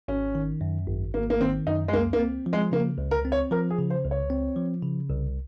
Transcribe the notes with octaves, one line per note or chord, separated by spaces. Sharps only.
G#1 C#4
D#3
F#2
G#1
G#1 A#3
A#3
D#3 C4
F#2 D#4
G#3
C#2 A#3
A#3
C4
F3
G#3
C#3 A#3
C#2
A#4
C4
C#5
F3 A#4
G#4
C#3
C5
C#2
C#5
C4
F3
C#3
C2